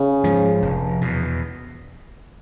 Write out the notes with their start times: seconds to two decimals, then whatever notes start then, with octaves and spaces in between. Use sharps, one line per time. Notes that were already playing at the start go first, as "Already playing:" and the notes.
Already playing: C#3
0.24 G#2 F3
0.62 F1
1.01 E2 B2